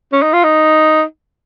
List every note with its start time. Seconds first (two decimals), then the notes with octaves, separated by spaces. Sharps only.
0.13 C#4
0.23 D#4
0.33 F4
0.44 D#4